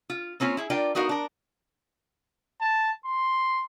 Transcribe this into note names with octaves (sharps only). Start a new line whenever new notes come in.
F4
A#3 C4 C#4 F4
E4 G#4
D4 F4 A#4 D5 G5
B3 D#4 F#4 A#4 F5
D4 A#4
A5
C6